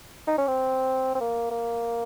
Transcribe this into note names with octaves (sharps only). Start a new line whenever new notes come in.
D#4
C#4
C4
C4
A#3
A#3